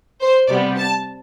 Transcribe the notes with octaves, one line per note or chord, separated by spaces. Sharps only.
C5
C3 G3 B3 D5
A5